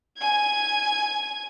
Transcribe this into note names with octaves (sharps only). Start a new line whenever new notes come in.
G#5 G#6